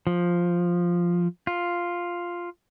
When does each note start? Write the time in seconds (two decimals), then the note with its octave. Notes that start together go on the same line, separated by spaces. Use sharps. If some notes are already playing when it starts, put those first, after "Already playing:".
0.07 F3
1.47 F4